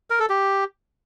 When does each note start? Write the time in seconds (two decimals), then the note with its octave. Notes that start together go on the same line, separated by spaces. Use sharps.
0.10 A#4
0.20 A4
0.30 G4